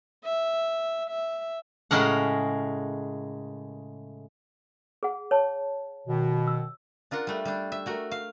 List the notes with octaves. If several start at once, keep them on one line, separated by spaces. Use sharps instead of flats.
E5
E5
A2 C#3 G#3 A#4 F#5
G#4 F#5
C#5 A5
B2 D#3
E6
D4 F4 A#4 F#5
G3 A3
G3 D4
E5
A3 F#4 A#4
F5